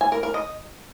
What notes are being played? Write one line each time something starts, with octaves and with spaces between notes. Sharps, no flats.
G#5
A#4
A#4
D#5